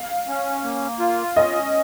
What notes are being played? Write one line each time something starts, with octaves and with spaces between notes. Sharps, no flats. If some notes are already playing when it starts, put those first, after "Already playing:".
Already playing: F5
C#4
A#3
F4
C#4 D#5